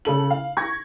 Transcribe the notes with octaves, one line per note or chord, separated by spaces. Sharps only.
C#3 A4 F#7
F5
C#6 G#6 A#6